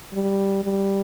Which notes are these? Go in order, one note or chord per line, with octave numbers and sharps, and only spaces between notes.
G3
G3